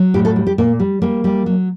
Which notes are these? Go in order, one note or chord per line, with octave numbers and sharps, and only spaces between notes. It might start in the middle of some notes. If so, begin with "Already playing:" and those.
Already playing: F#3
A2 G4
A4
G3
G4
A#2 A#3
G3
G3 A#3
G3
F#3